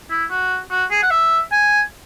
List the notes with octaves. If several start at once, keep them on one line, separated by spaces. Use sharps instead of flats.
E4
F#4
F#4
G#4
F#5
E5
G#5